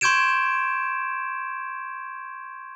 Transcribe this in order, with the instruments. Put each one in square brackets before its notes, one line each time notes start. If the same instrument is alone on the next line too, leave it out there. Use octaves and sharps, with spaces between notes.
[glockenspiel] C6 C#6 G6 G#6 D7 E7